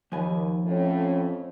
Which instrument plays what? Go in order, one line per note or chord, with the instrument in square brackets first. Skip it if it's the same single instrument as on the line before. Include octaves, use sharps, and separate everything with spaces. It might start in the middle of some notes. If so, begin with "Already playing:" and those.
[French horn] D#2 [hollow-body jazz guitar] F3 G#5 B5
[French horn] F2 [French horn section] A2 C#4